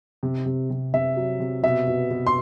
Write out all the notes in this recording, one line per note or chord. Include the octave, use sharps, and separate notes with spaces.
C3
C3
C3
C3 E5
F#3
C3
B2 E5
B2
B2
C6